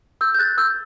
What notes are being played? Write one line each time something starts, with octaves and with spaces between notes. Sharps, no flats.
E6 G6
G6
F#6 A6
E6 G6